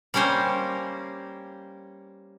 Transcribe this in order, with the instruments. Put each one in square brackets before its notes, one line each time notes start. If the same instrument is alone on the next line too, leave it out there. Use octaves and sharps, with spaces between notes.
[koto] G3 A#3 C#4 A#4 C5